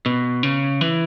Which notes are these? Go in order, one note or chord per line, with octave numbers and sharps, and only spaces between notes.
B2
C#3
E3